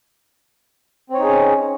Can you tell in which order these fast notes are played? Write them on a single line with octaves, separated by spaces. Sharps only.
C4 C#5 D#4 G#4 C#4